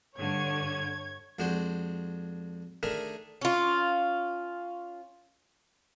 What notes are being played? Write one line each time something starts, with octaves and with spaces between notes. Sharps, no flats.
G2 D3 C#5 G#6
F2 G#3 D4 F#4 C5
D#3 A3 D4 G#4 A#4
C#4 F4